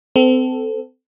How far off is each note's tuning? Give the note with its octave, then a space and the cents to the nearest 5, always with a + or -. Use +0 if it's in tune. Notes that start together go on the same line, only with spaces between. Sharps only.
C4 -35 A4 +0